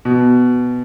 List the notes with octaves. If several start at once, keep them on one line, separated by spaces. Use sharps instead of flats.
B2